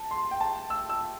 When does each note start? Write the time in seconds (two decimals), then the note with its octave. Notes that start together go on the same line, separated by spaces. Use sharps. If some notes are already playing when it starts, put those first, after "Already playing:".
Already playing: A5
0.11 C6
0.31 G5
0.41 A5
0.70 E6
0.89 E6